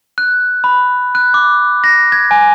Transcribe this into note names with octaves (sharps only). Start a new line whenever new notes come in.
F#6
B5
F#6
D6
A#6
G#6
G#5